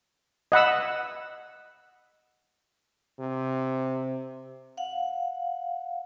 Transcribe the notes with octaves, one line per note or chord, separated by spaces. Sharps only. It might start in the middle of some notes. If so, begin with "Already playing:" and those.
D#5 F#5 B5 E6
C3
F5 F#5